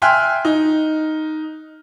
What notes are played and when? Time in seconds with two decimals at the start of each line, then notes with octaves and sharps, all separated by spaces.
0.02 E5 G5 G#5 C6 F6 F#6
0.45 D#4